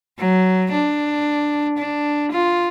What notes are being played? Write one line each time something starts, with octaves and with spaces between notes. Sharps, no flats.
F#3
D4
D4
F4